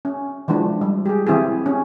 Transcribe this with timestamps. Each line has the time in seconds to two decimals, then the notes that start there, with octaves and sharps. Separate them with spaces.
0.05 C#4
0.48 E3 F3 G#3 D4
0.81 G3
1.06 G4 G#4
1.27 E3 C4 E4 G4 G#4
1.66 C#4